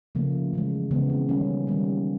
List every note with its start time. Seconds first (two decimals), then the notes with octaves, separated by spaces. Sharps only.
0.15 C#3 F3 A3 A#3
0.53 C#3 E3 G#3
0.91 C#3 E3 G#3 B3
1.10 C4
1.29 D#3 G3 A#3 C#4
1.67 D#3 G3 A#3